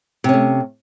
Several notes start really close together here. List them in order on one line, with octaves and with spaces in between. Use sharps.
C3 C#4 A3